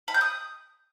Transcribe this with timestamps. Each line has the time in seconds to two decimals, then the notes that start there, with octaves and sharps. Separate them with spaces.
0.08 B5
0.14 G6
0.21 D#6